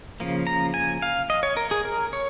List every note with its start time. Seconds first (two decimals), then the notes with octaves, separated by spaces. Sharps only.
0.20 C#3 F3 A#3
0.47 A#5
0.74 G#5
1.02 F5
1.30 D#5
1.43 C#5
1.57 A#4
1.71 G#4
1.85 A#4
2.13 C#5